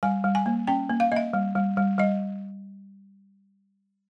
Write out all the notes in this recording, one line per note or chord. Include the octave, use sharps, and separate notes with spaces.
G3 G#5
G3
G#5
A#3
C#4 G5
A#3
F5
A#3 D#5 E5
G3
G3
G3
G3 D#5